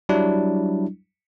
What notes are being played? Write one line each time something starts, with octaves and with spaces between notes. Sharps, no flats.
F#3 G3 D4 E4